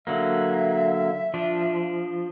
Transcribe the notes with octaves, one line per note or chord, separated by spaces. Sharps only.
D3 F#3 A#3 E5
F3 D4